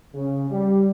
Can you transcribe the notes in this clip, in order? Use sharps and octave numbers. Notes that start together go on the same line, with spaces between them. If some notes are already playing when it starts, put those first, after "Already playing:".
C#3
G3